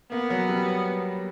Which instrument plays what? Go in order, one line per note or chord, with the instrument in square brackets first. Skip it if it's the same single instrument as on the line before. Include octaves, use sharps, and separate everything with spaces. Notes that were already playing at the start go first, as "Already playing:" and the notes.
[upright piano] A#3 [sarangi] B3
[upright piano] F#3
G3